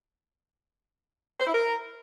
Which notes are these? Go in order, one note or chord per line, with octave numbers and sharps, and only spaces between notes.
C5
E4
A#4